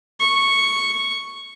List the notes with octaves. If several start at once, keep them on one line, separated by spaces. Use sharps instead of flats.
C#6